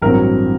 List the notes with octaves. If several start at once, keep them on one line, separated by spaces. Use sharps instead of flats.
A1 G2 F#3 C4 A#4